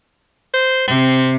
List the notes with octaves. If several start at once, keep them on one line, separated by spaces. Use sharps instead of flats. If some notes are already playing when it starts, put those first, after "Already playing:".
C5
C3 C4